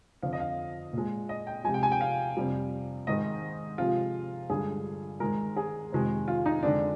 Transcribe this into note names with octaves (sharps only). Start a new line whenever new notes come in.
F2 D3 F3 F5
D#5
F5
A#2 G#3
D#5
G5
C3 F3 G#3 G#5
G5
G#5
G5
F5
F2 C3 G3
G#2 D#3 G#3 D#5
C3 F3 G#3 F4
G2 D3 G#3 G#4
G#2 D#3 G#3 A#4
G#4
F2 C3 D#3 G#3
F4
D#4
F2 D3 G#3 D4